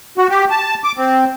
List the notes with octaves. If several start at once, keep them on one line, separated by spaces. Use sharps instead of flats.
F#4
G4
A5
D6
C4